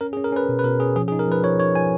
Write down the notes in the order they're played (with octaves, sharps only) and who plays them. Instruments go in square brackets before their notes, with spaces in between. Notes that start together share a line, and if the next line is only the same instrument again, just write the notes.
[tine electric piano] C#4 A#4
G#4
C#4
A#4
C#4 B4
B2
B4
B2 A#4
C#4 G#4
F3 G#4
G#4
D#4
A#4
F3 B4
F3 C#5
D#4 C#5
F3 G#5